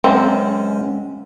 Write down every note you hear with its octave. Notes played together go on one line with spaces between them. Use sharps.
C#2 F#2 G#3 C4 C#4